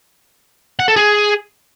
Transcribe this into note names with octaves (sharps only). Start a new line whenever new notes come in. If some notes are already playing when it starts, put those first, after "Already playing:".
F#5
A4
G#4